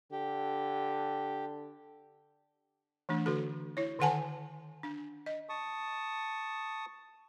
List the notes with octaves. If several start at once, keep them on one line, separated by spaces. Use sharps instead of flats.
D3 G4
E3 A3 D4
D3 F#4 A4
E4 C#5
D3 D#3 A4 F#5 G#5 A5
D4
D#5
A5 C#6 D#6